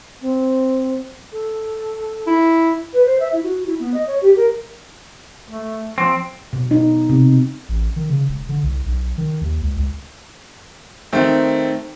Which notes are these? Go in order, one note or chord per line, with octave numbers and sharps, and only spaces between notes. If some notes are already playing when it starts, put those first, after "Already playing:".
C4
A4
E4
B4
C5
E5
E4
F#4
E4
B3
D#5
C#5
G4
A#4
A3
F3 C4
B2
D#4
C3
A1
D#3
C#3
E1
D3
C2
B1
D#3
D#2
C#2
C#2
D#3 A3 C4